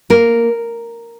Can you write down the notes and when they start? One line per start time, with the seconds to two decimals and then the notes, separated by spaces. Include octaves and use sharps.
0.10 A#3 A#4